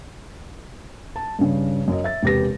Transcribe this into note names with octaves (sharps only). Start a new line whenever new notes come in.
A5
G2 C#3
F#2 D#5
E5 A6
E1 C3 G4 B4 A#6